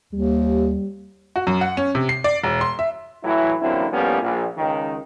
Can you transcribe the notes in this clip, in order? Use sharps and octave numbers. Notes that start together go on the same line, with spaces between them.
D#2 G3
F#4
F#2
F#5
C#4
C3
C7
D5
E1
C6
E5
A2 E3 F#3 E4
A1 D3 F#3 A#3 C4 E4
A2 F3 G3 A#3 B3 C#4
A#1
C#2 D#3